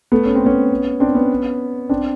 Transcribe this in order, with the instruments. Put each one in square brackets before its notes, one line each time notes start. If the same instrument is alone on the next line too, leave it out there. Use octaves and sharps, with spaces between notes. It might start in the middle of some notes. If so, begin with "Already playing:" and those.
[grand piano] A3 B3
C#4
C4
B3 C#4
C4 D4
B3 C#4
C4 D4